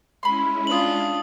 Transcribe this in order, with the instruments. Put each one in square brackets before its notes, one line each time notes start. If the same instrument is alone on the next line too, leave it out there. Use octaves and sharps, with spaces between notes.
[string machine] G#3 C#4 E4 [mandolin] B5 C6
[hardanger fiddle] D4 F4 [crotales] D#6 F#7